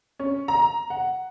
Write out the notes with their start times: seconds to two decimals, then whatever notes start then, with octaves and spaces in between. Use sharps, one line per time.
0.19 C#4
0.48 A#5
0.90 F#5